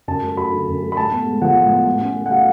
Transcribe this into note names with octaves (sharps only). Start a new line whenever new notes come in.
F#2 A5
A3
F#3 B5
D3
F#2
A3
B5
A2 A5
B3
G#3
F3 F#5
A2
B3
A2
C#4
A3
F#5
F#3 F5